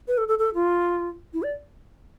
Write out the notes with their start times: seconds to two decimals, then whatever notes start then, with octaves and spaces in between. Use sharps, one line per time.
0.08 B4
0.18 A4
0.28 A4
0.39 A4
0.54 F4
1.33 E4
1.43 D5